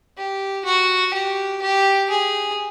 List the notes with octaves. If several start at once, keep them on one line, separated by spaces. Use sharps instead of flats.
G4
F#4
G4
G4
G#4